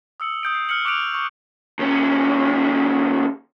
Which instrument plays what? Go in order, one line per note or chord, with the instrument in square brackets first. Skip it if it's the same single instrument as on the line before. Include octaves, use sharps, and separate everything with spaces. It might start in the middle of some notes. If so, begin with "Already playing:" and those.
[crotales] D#6 E6 C#7 F#7
D#6 G6 D7
C7
F6 F#6 C#7 F#7
C#6 D6 F6 F#6 D7 F7
C#6
[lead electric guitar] D#2 C#4